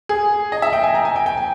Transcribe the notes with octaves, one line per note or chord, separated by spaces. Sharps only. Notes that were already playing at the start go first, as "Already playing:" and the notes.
G#4
D#5
E5
G5
G#5
A#5
G#5
G5
G5
G#5